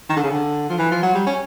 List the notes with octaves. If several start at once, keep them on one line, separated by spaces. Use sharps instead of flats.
D#3
D3
C#3
D3
F3
E3
F3
F#3
G3
C#4